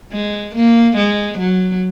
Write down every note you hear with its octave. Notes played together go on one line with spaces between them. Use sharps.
G#3
A#3
G#3
F#3